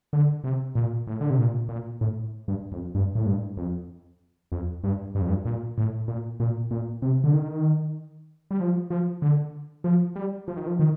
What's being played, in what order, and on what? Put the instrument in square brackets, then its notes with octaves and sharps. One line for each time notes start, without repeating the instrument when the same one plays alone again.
[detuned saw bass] D3
C3
A#2
A2
D3
C3
A#2
A#2
A2
G2
F2
G2
A2
G2
F2
F2
G2
G2
F2
G2
A#2
A2
A#2
A#2
A#2
C3
D3
D#3
G3
F3
F3
D3
F3
G3
F3
D#3
F3
D#3